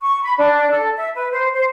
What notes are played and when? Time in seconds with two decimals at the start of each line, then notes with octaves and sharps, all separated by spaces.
0.01 C#6
0.24 B5
0.39 D4
0.71 A4
0.96 E5
1.15 B4
1.31 C5
1.54 C5